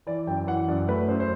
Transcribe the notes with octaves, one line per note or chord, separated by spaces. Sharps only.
E3 D5
F#2 G5
E3 F#5
F#2 D5
A3 B4
F#2 C5
C5